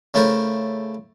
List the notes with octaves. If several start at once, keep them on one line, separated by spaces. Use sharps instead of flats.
C#3 A3 E4 A4 A#4 C5